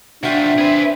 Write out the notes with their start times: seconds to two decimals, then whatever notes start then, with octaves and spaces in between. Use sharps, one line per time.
0.23 C3 D4 F4 F#4 E5 G5
0.58 C4 G#4 B4